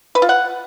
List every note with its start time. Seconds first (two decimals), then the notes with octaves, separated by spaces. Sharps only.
0.15 B4
0.22 F4
0.29 F#5